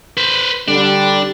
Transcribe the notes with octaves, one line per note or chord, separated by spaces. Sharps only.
B4 C5
D3 G3 D4